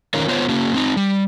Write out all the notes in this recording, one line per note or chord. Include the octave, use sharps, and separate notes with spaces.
D#3 C#4 D#4 F4 A#4 C#5
B3 F4 C5 C#5
A#3 C#4 F#4
C4 D#4
G3